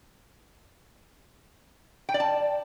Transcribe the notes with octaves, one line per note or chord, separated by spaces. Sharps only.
G5
D5
A5